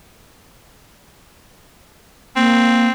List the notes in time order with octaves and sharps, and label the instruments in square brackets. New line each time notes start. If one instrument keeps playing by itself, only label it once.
[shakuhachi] A#3 [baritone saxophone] C4